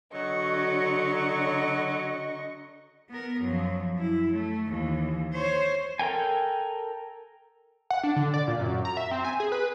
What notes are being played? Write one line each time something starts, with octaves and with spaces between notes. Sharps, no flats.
D3 F#3 D#5 C#6
B3 A#4
F#2 F3
F#2 E4
A3
D#2 E3
C5 C#5
A4 A#4 G5 G#5
F#5
D4
D3
D5
A#2
F#2
A#5
E5
C4
G#5
G#4
B4